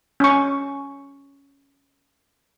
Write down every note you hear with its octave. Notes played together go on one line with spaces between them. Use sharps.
C#4 C#6